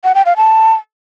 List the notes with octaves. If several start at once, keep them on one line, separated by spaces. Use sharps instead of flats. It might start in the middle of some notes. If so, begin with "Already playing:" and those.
F#5
G5
F5
A5